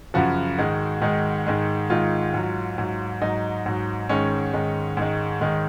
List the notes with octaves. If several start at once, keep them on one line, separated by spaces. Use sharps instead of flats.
F#2 C#3 F3 F#4
G#2 D#3 G#3
G#2 D#3 G#3
G#2 D#3 G#3
G#2 D#3 G#3 F4
G#2 F#3
G#2 F#3
G#2 F#3 D#4
G#2 F#3
G#2 D#3 G#3 C#4
G#2 D#3 G#3
G#2 D#3 G#3
G#2 D#3 G#3